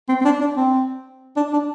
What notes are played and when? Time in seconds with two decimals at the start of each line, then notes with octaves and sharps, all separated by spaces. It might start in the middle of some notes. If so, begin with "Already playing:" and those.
0.09 C4
0.21 C4
0.25 D4
0.41 D4
0.57 C4
1.37 D4
1.53 D4